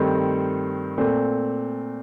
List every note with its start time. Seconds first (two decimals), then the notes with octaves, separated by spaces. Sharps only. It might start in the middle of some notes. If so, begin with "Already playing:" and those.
Already playing: G2 D#3 A3 C4
0.97 A#2 A3 C4